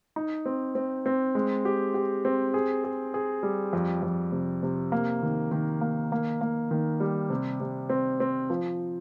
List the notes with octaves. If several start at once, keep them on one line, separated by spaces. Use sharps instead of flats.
D#4
C4
C4
C4
G#3
G4
G4
C4
G#4
G#4
G#4
G3
F2
F2
C3
C3
A#3
D#3
D#3
A#3
A#3
A#3
D#3
G3
C3
C3
C4
C4
F3